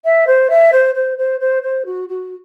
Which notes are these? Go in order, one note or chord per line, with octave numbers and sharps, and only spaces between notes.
E5
C5
E5
C5
C5
C5
C5
C5
F#4
F#4